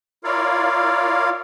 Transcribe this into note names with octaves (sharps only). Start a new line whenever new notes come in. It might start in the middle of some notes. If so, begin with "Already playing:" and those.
E4 F4 A#4 C#5 D5 F5